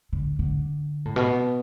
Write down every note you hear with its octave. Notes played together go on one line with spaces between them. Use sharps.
D3
D3
A2
B2